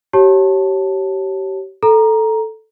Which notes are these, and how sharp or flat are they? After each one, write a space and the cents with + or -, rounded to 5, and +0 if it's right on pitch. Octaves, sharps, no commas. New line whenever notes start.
G4 -30 C#5 -15 A5 +0
A4 +0 A#5 +10